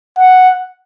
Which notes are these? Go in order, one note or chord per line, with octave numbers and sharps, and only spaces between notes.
F#5